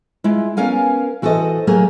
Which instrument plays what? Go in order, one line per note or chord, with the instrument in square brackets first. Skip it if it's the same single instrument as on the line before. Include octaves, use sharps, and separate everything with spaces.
[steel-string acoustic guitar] G#3 E4 F4
B3 C#4 A#4 F5 G#5
E3 F#4 A4 C5 D#5
F#3 A3 A#3 G4 G#4 A#4